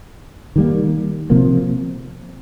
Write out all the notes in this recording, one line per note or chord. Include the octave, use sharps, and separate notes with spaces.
D#3 G3 A#3
C3 F3 A#3